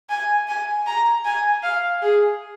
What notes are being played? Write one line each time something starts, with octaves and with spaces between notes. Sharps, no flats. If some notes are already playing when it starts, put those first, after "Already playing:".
G#5
G#5
A#5
G#5
F5
G#4